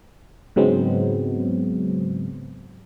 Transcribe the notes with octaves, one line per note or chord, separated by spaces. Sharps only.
G#2 C#3 F#3 G#3 B3 C4